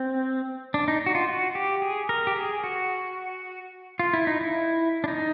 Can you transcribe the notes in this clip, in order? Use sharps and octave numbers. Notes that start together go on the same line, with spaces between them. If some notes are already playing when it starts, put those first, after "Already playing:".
Already playing: C4
D4
D#4
F#4
F4
F#4
G4
G#4
A#4
G4
G#4
F#4
F4
E4
D#4
E4
D4
D#4